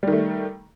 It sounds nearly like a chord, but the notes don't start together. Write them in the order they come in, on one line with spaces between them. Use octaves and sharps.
G3 D#3 A3